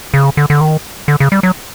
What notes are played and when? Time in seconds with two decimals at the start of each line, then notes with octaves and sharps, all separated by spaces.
0.14 C#3
0.37 D3
0.50 D3
0.61 D#3
1.08 D3
1.20 C#3
1.32 G3
1.43 F#3